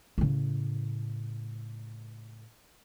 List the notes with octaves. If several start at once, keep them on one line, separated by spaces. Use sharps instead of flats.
A2 C#3